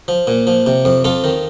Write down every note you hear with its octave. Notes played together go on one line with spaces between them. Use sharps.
F3
A#2
F3
C3
F2
F2 F4 A4
D#3